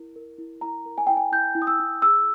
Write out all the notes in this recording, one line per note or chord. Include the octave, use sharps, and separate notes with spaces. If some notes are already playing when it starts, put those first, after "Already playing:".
Already playing: E4 A#4
A#4
E4
E4 A#5
A#4
G#5
E4 G5
G#5
E4 G6
E4
D#6
E6
E4
G#4 E6